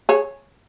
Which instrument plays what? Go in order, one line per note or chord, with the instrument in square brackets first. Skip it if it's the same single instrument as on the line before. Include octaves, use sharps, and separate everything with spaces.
[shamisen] G#4 C#5